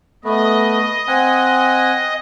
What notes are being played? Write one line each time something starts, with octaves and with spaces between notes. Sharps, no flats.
A3 B3 D#5
C4 F#5 G#5